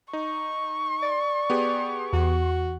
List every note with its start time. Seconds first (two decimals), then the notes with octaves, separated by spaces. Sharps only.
0.13 D#4 C#6
1.03 D5
1.50 B3 G4 G#4
2.13 E2 F#4